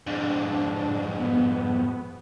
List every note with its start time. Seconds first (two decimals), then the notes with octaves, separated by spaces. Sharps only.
0.07 F2 G#2 D4
1.19 B3